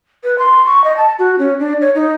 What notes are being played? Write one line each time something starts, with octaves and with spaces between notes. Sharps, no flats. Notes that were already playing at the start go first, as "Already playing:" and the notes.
B4
C6
C#6
D#5
A5
F#4
C#4
D4
C#5
D#4